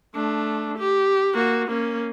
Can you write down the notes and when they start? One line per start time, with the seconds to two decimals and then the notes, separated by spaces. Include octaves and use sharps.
0.15 A3 D4
0.78 G4
1.34 A#3 F#4
1.68 A#3 C#4